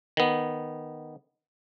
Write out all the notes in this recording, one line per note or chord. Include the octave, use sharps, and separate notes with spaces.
D#3 B3